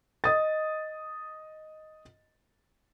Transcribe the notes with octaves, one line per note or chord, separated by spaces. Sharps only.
D#5 D#6 A6